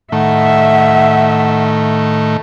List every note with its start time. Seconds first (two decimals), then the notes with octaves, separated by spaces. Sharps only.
0.12 A2 D#3 A3 E5 F#5